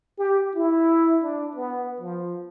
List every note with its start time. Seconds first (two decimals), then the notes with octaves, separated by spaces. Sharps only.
0.18 G4
0.55 E4
1.22 D4
1.56 B3
2.00 F3